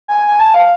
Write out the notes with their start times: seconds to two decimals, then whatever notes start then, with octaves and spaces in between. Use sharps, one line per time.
0.08 G#5
0.28 G#5
0.40 A5
0.54 F5